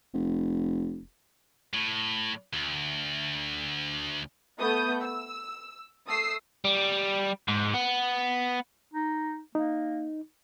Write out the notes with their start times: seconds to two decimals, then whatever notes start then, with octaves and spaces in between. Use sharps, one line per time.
0.14 F1
1.73 A2
2.53 D2
4.58 A3 B3 D#6 G6
5.01 E6
6.06 A3 D#6 E6 C7
6.65 G3
7.48 G#2
7.74 B3
8.93 D#4
9.55 A#3 D#4